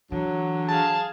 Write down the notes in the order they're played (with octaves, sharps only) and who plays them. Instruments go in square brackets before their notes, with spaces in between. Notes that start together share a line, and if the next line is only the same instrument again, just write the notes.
[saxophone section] D3 F#3 [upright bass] E3
[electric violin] G#4 F5 [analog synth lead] A5